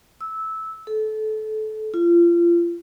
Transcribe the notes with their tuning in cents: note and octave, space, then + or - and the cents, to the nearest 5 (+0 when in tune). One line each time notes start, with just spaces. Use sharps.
E6 -15
A4 -25
F4 -30